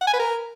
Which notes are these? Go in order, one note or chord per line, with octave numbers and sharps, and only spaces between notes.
F#5
G#5
B4
A#4